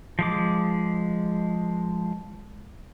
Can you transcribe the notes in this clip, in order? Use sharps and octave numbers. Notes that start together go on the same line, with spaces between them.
F3 G#3 D6